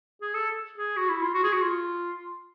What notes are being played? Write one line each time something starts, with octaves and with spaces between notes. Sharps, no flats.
G#4
A4
G#4
F#4
E4
F4
F#4
G#4
F#4
F4